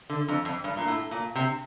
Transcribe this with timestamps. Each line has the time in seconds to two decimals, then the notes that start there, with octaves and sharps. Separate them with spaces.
0.10 D3
0.28 F2
0.45 F2
0.64 G2
0.77 A#2
0.87 A2
1.11 A#2
1.35 C3